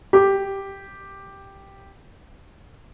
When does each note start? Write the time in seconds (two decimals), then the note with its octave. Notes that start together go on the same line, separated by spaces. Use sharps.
0.13 G4 D6